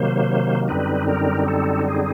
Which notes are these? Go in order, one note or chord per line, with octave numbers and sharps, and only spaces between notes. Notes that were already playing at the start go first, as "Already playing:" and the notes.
Already playing: C3 D#3 F#3 A#3 C5
F#2 D3 G3 C4 D#4 B4
A#4
A4
G#4